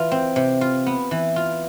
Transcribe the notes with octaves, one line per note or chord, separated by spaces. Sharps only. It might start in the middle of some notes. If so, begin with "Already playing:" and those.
Already playing: E3 F4
C4
C3
F4
B3
E3
F4